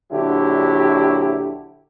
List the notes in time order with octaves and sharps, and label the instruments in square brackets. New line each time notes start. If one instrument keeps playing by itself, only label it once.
[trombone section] A#1 D3 F#3 E4 G4